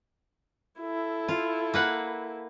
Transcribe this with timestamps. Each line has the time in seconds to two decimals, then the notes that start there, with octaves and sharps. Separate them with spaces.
0.80 E4 A4
1.28 F4
1.74 A#3 B4 F#5